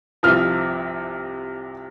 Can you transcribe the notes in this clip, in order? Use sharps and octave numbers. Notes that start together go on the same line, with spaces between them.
C2 C3 F3 F6